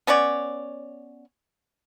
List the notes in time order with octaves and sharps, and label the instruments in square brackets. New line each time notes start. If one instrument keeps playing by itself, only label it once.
[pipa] B3 C#4 C#5 D5